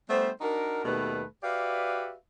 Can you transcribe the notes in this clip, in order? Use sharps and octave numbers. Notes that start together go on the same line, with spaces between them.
G3 A3 B3 D4 C5
D4 D#4 F#4 A#4
D#2 B2 D#3 G3 A3 B4
F#4 G4 B4 D5 E5 F5